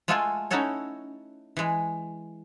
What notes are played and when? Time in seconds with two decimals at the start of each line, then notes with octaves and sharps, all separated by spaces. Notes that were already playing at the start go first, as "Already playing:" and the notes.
0.08 G#3 A3 F4 F#4 A4 G#5
0.51 C#4 D#4 E4 F#4 A4 C#5
1.57 E3 G#3